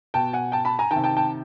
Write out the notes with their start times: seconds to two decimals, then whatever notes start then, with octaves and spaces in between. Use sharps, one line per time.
0.14 B2 G5 A5
0.33 F#5 G#5
0.52 G5 A5
0.65 A5 B5
0.79 G#5 A#5
0.91 D#3 G5 A5
0.96 C3
1.04 G5 A5
1.17 G5 A5